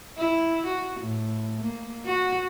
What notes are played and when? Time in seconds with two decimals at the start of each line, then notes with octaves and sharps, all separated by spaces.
0.18 E4
0.67 F#4
1.01 A2
1.61 A#3
2.06 F#4